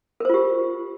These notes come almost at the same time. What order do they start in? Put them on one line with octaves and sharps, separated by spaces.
A#4 C5 F4 G4